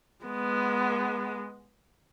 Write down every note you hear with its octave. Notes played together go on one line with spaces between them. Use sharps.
G#3 B3